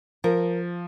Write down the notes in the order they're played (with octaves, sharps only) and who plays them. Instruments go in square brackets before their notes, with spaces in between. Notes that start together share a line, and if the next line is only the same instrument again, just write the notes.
[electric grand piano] F3 [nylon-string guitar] A#4